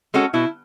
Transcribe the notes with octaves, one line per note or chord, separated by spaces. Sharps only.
G#3 C#4 F#4 A4
B2 E4